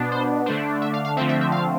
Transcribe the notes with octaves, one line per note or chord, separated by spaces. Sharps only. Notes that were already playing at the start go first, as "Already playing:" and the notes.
Already playing: B2 B3 D4
C5
D3 A3 D4 C5
E5
F5
F5
D3 F3 A3 C4 E5
E5
E5
F5